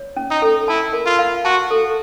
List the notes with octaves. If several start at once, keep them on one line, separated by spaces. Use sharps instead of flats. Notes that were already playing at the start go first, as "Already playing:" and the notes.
Already playing: C#5
C#4
D#4
A4
E4 A5
A#4
F4
F5
F#4 A5
A4